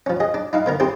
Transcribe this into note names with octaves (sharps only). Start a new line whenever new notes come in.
F3 C#4
G#4 D#5
D4
D#4 E4 F5
D3 B3 A#4
C4 E4 G4 G#4 C5